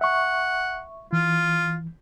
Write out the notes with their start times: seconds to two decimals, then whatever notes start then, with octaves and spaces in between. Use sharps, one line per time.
0.01 E5 F#5 C#6
1.13 E3 F4